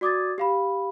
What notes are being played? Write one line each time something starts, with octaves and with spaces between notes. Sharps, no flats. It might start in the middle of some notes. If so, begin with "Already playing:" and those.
F#4 D5 D6 D#6 G#6 A6
G4 F5 B5